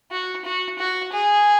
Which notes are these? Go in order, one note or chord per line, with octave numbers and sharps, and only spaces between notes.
F#4
F#4
F#4
G#4